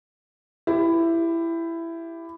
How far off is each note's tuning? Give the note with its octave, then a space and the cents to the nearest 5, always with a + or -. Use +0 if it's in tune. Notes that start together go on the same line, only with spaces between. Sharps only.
E4 +15 G4 +0